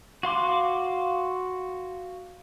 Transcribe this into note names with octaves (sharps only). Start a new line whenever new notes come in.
F#4 F5 C6 D6